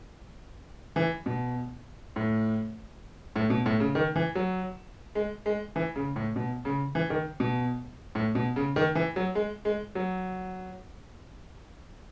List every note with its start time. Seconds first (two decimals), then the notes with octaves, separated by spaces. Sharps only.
0.96 E3
1.26 B2
2.16 A2
3.36 A2
3.50 B2
3.66 A2
3.80 C#3
3.95 D#3
4.16 E3
4.35 F#3
5.15 G#3
5.46 G#3
5.76 E3
5.96 C#3
6.16 A2
6.36 B2
6.65 C#3
6.95 E3
7.10 D#3
7.40 B2
8.15 A2
8.35 B2
8.56 C#3
8.76 D#3
8.95 E3
9.16 F#3
9.35 G#3
9.65 G#3
9.95 F#3